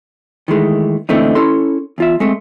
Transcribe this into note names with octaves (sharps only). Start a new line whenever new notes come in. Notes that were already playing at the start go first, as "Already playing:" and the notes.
D#3 E3 G#3 A3
A#2 D3 E3 A3 C4 D#4
C#4 E4 A4 C6
E2 F4 E5
G#3 A3 C4